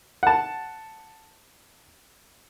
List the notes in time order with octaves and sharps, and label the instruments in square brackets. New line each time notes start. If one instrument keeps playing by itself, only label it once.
[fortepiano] F#5 A5